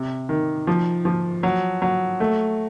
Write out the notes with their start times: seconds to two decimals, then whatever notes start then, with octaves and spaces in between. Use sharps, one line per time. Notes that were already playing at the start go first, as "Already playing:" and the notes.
Already playing: C3
0.29 D#3
0.67 F3
1.05 F3
1.43 F#3
1.82 F#3
2.20 A3